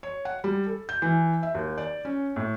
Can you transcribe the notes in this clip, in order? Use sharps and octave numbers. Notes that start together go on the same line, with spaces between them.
C#5
F#5
G3
A4
G6
E3
E5
D#2
D5
C#4
A2